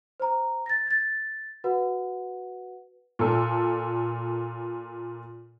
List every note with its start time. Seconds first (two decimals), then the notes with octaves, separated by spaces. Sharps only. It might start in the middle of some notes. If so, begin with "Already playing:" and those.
0.20 C5 A#5
0.66 A6 A#6
0.87 G#6 A6
1.64 F#4 B4 F#5
3.19 A#2 A4